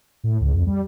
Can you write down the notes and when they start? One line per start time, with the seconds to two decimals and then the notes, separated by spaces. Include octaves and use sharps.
0.24 A2
0.40 C#2
0.53 F2
0.66 G3